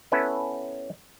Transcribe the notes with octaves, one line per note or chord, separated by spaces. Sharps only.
B3 C#4 E4 A4 B4 E5